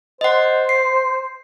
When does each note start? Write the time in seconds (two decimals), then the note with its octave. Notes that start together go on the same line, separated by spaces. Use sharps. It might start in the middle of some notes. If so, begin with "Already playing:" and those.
0.21 C5 D#5 F#5
0.69 C7